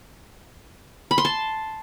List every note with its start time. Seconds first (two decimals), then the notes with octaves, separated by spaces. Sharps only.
1.11 B5
1.18 C6
1.25 A5